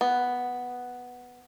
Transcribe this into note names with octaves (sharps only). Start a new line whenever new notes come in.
B3